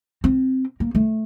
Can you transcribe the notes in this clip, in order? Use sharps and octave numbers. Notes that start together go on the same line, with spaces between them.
C4
A#3
A3